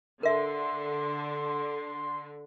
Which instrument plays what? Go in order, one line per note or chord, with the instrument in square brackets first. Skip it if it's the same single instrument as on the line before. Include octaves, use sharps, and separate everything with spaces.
[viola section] D3 [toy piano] A#4 E5 [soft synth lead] C6